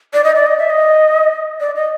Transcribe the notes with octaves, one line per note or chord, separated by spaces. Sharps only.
D5
D#5
D5
D#5
E5
D#5
D5
D#5